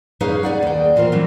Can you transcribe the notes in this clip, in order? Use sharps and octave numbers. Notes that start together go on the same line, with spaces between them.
F#2 D#4 G#4 B4 C#5 F5
G#4 D5 F#5
D#2 G5
A#2 E3 F4 A#4 C5
E3 F#3 C4 C#4